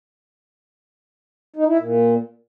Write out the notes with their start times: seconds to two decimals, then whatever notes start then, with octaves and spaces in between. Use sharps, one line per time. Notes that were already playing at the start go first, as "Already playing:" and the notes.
1.56 D#4
1.67 E4
1.78 A#2